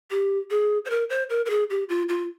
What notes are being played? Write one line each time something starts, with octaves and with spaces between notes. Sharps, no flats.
G4
G#4
C5
A#4
C5
A#4
A#4
G#4
G4
F4
F4